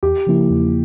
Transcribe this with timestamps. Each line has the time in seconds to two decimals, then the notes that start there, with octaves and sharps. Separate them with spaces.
0.03 E2 G4
0.27 C#3 F3 A#3 E4
0.50 E2